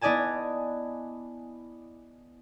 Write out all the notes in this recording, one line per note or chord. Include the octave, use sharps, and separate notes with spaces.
B3 E4 D5 D#5 G#5 A5